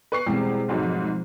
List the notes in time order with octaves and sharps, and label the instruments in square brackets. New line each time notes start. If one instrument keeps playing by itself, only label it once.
[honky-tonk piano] B4 C#6 C7
[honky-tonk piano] E2 G3 [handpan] B2 G#3 C4
[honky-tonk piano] F1 G#2 F#3
[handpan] F3